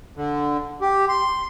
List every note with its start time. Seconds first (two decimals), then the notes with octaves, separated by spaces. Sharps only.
0.16 D3
0.81 G4
1.09 C6